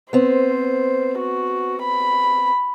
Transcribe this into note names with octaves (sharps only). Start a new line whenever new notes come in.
B3 C4 C5
F#4
B5